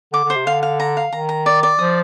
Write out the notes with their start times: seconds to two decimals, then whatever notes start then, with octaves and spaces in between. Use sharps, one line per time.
0.13 D3 D6
0.24 D3
0.30 C5
0.36 C3
0.46 D3 F5
0.63 F5
0.80 A#5
0.97 F5
1.12 D#3 A#5
1.29 A#5
1.46 D5
1.63 D5
1.79 F3 D#6